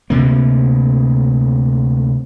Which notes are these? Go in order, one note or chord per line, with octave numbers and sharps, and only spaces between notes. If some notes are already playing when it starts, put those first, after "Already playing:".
D2 C3 A#3